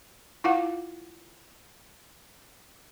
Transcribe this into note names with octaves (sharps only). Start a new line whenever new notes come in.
E4 F4 F5 F#5